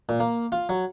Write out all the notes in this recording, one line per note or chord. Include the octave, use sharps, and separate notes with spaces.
A#2
A#3
F4
F#3